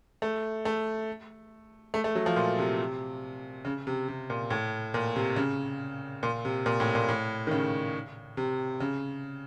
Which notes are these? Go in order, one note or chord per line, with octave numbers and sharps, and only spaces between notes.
A3
A3
A3
A3
F#3
F3
A#2
C3
C#3
C3
C3
A#2
A2
A#2
C3
C#3
A#2
C3
A#2
A2
A#2
A2
D#3
C#3
C3
C#3